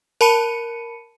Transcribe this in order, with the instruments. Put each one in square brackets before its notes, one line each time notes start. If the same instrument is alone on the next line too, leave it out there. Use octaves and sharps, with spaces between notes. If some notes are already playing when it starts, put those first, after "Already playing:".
[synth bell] A#4 A5 B5 C#7 D#7